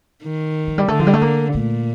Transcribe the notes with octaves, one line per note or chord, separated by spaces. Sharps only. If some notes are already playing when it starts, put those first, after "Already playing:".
D#3
F3
G3
D3 A3
F3
G3
A3
A#3
A#2 A3